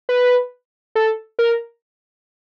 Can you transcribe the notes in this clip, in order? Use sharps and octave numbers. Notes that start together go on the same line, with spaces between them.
B4
A4
A#4